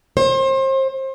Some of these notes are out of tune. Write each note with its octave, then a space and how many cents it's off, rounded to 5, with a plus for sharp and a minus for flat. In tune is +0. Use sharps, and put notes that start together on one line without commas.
C5 +35